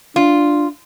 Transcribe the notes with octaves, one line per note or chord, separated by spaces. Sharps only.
D4 F4